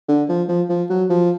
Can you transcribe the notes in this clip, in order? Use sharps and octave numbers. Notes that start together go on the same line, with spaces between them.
D3
F3
F3
F3
F#3
F3